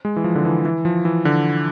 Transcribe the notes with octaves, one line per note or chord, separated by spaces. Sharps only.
G#3
E3
F3
D3
E3
E3
F3
E3
D3